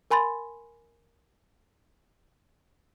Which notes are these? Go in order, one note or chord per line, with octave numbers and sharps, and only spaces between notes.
A#4 G#5 B5 C6 A6